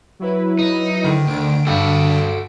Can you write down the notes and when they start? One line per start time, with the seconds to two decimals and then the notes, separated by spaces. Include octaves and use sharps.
0.20 F#3 E4 B4
0.59 D#4
1.04 D3 D#3
1.27 D2 D7
1.67 G2 F#4 A4